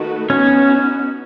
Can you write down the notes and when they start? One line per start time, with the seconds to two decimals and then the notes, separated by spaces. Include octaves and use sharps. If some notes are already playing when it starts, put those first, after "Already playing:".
Already playing: D#3 A3 D#4 F#4 B4
0.30 B3 C#4 D#4 F#4